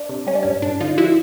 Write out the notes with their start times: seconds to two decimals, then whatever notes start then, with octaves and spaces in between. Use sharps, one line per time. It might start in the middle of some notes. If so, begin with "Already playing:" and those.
Already playing: D4
0.09 C3
0.27 G3 C#4
0.35 D4
0.43 G2 C#4
0.62 G2 D4
0.80 D3 D#4 F4
0.98 F3 E4 F#4